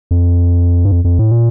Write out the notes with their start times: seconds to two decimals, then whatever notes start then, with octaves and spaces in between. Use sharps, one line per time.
0.11 F2
0.85 G2
0.91 F2
1.05 F2
1.19 A2
1.32 A#2